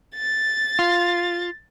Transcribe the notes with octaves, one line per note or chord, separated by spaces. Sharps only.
A6
F4